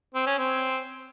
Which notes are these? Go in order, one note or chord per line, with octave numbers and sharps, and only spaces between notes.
C4
C#4
C4